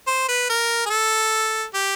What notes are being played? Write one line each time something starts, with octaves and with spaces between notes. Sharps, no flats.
C5
B4
A#4
G#4
A4
G4